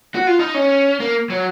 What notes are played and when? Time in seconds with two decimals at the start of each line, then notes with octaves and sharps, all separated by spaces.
0.15 F#4
0.27 F4
0.39 D#4
0.54 C#4
1.00 A#3
1.30 F#3